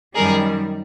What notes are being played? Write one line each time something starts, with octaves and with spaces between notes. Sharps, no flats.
F#2 D#3 G3 G#4 A#4